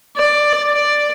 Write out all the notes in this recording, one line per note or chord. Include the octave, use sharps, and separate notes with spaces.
D5
D5